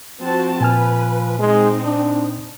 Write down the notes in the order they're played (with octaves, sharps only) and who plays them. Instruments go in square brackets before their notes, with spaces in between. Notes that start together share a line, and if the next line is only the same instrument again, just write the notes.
[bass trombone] F3 [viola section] C4 F#4 A5
[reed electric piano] A#2 G#5 F6 [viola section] B4
[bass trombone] G#3 [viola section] C4 D#4
[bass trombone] D4